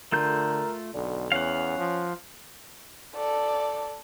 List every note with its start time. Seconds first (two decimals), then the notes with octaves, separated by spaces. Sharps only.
0.12 D3 A3 F4 A#4 G6
0.94 B1 D3
1.32 E2 C#4 F5 F#5
1.78 F3
3.16 A4 D5